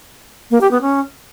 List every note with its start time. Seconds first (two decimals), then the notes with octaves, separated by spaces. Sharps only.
0.51 A#3
0.61 G4
0.71 B3
0.81 C#4